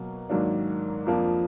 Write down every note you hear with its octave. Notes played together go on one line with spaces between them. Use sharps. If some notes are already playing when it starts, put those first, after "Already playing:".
Already playing: B2 F#3 A#3
G#2 D#3 F#3 A#3 D4
F2 F3 A#3 D4